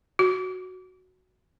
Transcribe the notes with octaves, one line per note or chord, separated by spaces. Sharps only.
F#4